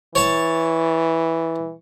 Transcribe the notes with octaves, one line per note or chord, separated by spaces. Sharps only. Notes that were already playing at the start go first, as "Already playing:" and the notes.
E3 C#5 A5